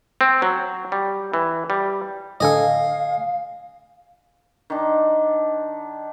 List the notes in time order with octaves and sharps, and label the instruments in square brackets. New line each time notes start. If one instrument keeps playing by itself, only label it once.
[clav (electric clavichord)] C4
F#3
G3
E3
G3
[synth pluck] A2 D3 A4 [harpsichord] D#5 G#5 [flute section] F5
[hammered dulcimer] D#3 D4